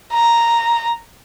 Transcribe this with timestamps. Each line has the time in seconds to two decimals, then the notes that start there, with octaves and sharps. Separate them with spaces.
0.13 A#5